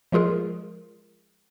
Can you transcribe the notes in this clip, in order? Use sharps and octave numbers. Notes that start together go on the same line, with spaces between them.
F3 G#3 F4 G#4 A#4